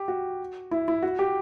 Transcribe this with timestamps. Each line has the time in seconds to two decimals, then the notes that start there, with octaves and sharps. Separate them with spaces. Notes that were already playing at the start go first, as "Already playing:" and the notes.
Already playing: G4
0.08 F#4
0.71 E4
0.88 E4
1.02 F#4
1.19 G4